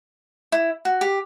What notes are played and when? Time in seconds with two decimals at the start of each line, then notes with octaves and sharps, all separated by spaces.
0.52 E4
0.85 F#4
1.01 G4